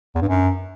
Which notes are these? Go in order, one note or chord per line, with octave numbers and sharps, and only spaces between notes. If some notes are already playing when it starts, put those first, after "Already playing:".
E2
G2
F#2